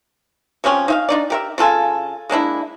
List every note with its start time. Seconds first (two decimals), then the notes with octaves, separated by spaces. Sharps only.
0.64 C3 F3 C#4 G4
0.88 D#4 E5 F5
1.09 D4 D#4 D5
1.30 G4 A#4 E5
1.58 C#3 F4 A4 G#5
2.29 G#3 A#3 D4 E4